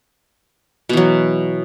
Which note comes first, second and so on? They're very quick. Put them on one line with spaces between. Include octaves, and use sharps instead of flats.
B2 E3 F#3